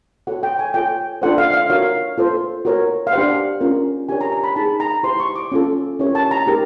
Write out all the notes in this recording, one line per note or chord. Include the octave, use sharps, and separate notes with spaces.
F#4 A4 C#5 F#5
G5
G#5
F4 A4 C#5 G5
D4 F4 A4 C5 F#5
F5
F5
F#4 A#4 C#5 F5
F4 A4 C5
F#4 A#4 C#5
F5
D4 G4 C5 F#5
C#4 F4 A#4
D4 G4 A#4 C#5 G#5
A#5
A#5
B5
D#4 G#4 C5 A5
A#5
E4 G4 C5 C6
C#6
D6
C#4 F4 A4
C#4 E4 G4 A#4 C#5
A5
A#5
D#4 G4 A#4